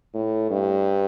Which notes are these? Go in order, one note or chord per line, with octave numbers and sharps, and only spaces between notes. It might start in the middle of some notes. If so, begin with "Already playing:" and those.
A2
G2